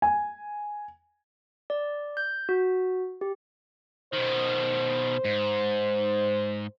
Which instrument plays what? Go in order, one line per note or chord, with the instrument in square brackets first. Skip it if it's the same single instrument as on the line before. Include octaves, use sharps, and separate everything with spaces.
[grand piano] G#5
[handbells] D5
G6
F#4
G4
[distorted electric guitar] B2 D#3 [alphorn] C5
[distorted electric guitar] G#2